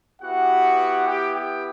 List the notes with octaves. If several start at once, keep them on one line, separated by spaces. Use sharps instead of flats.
B3 E4 F#4 G4 F#5
G4 G5
G4 G5